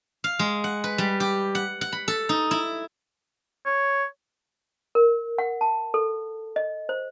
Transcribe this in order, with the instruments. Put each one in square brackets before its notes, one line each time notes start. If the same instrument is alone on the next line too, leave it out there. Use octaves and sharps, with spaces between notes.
[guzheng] F5
G#3
F#5
B4
G3
G4
F#5
F#5
B5
A4
D#4
E4
[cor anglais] C#5
[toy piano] A#4
F#5
A5
A4
D#5
C5